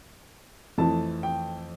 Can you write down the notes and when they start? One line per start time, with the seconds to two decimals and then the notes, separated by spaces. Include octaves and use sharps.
0.78 F2 E3 A3 E4 A5
1.23 G5